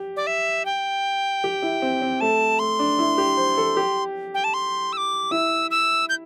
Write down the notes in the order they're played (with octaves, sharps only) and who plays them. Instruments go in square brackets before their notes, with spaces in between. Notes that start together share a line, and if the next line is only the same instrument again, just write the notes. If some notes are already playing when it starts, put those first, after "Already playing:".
Already playing: [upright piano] G4
[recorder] D5
E5
G5
[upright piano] G4
E4
C4
C4
[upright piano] A3 [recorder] A5
[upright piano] A3 [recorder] C6
[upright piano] D4
E4
G4
C5
A4
G4
[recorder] G5
A5
C6
E6
D6
[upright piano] E4 [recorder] E6
[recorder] E6
G6